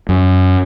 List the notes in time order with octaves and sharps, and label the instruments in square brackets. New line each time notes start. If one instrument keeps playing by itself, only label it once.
[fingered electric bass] F#2